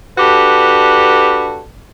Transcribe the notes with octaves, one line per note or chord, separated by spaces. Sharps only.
D4 F#4 G4 A4 B4